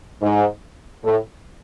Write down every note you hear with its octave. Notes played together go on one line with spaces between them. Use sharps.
G#2
A2